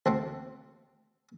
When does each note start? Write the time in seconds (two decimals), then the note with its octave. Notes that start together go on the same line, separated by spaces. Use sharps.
0.06 D2 C4 F#5